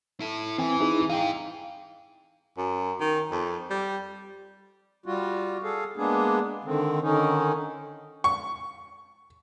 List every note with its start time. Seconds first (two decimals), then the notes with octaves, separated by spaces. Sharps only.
0.20 E4 A4
0.58 E3 C4 G#5
0.80 D#4 E4 G#4
1.09 D#4 G#4 F5 G5
2.58 F#2
3.00 D#3
3.31 F2
3.70 G3
5.06 G3 F4 F#4
5.63 G#4 A4 F5
5.97 G#3 A#3 B3 D4 G#4
6.65 D3 D#3 C4
7.02 D3 D#3 C#4 D#4
8.24 C#6